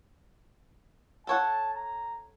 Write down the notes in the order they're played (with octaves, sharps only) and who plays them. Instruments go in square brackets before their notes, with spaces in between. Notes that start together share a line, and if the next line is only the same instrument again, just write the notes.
[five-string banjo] A4 C#5 F#5 [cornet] A5
[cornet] A#5